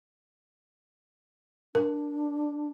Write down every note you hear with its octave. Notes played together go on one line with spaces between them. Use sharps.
D4 A#4